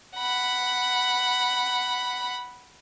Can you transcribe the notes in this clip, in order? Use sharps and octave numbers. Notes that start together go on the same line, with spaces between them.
F#5 B5